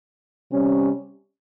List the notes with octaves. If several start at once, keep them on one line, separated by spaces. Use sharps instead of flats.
C3 G3 C#4